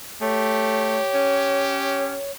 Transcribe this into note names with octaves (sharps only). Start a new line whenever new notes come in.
A3 G4 C#5
C#4